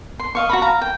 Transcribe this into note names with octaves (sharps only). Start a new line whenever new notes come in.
C6
D#5 F5 C#6
F#4 A#5 B5
F5 A#5
G5